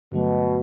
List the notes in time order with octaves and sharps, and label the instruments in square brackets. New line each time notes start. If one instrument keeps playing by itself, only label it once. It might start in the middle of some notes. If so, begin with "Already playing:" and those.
[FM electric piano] G2 D3 F#3 A3 [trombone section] B2